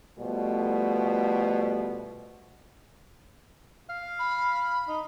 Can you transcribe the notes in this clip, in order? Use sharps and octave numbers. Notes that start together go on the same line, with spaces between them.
B2 F3 G3 A3
F5
B5
D#4